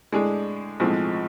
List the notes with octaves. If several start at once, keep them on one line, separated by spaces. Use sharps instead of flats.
A2 G#3 D4 G#4
B1 A2 F3 G#3 C4